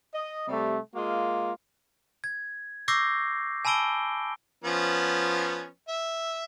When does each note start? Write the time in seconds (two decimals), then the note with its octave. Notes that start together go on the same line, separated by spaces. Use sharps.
0.14 D#5
0.48 C3 G3 A3
0.95 G#3 A#3 F4
2.24 G#6
2.88 C#6 D6 E6 G6 A#6 C7
3.65 G#5 A5 B5 E6 D7 G7
4.64 F3 B3 C#4
5.88 E5